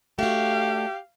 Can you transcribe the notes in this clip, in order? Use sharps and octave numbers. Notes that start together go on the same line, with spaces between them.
A3 D4 F#4 G4 F5